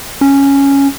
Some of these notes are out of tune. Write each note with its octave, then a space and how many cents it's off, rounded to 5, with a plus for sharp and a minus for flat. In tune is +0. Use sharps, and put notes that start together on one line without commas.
C#4 +0